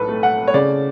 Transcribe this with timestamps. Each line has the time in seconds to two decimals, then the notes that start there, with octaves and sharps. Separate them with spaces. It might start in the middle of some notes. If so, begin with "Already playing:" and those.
Already playing: B1 A2 A4 B4
0.08 A3
0.23 F#5
0.48 C#5
0.54 C#3 D5